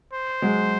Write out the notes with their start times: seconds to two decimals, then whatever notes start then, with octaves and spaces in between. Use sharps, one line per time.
0.13 C5
0.42 F#3 G#3